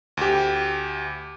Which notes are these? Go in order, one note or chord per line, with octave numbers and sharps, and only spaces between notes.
D2 G4